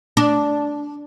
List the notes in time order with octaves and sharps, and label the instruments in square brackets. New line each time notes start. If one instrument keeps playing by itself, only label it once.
[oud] D4